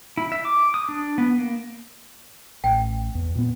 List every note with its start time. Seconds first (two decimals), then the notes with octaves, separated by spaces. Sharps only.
0.17 E4
0.32 E5
0.45 D6
0.74 D#6
0.89 D4
1.18 B3
1.38 A#3
2.64 A1 G5
3.15 E2
3.35 A#2 B3